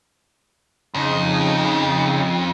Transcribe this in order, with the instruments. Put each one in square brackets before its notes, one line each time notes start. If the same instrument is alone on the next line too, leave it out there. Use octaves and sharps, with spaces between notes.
[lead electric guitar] F2 [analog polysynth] C#3 D#4